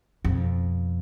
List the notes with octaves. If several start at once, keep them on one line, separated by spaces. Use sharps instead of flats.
F2 B2